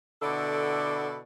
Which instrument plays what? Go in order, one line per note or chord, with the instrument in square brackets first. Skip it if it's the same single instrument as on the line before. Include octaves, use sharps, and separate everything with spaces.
[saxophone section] B2 D3 E4 A4 D5